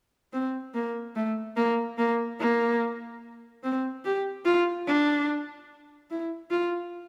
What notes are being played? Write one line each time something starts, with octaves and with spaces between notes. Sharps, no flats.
C4
A#3
A3
A#3
A#3
A#3
C4
G4
F4
D4
E4
F4